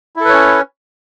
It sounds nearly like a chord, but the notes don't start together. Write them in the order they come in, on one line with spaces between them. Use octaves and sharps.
E4 A4 B4 C#5 C#4